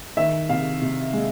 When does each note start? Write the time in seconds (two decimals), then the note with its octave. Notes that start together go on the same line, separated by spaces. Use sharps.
0.17 D#3 E5
0.49 C3 F5
0.82 C3
1.13 G#3